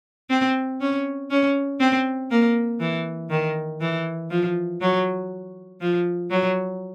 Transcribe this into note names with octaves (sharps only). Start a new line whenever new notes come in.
C4
C#4
C#4
C4
A#3
E3
D#3
E3
F3
F#3
F3
F#3